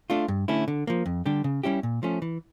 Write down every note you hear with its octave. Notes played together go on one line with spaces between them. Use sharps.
A3 D4 F4
G2
D3 A3 C#4 E4
D3
F3 A#3
F2
D3 G3 D4 G4
C#3
G3 C#4 E4 G4
A#2
F3 A3 C#4
E3